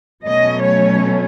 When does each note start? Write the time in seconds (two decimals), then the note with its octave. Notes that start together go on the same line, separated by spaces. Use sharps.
0.24 B2 F#3 A3 C#4 D#5
0.62 C#5